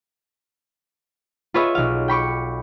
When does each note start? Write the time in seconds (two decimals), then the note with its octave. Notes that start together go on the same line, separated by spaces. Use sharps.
1.54 F4 G#4 B4 C#5 D#5 E5
1.75 B1 F5
2.08 G5 B5 C#6 D6